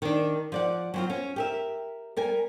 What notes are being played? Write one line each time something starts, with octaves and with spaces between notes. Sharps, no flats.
D#3 D4
F3 D5 F#5
F#3 C4 F4
C#4
G4 A#4 E5
G3 A#4 G#5